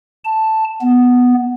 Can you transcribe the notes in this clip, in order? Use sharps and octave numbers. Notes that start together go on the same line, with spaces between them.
A5
B3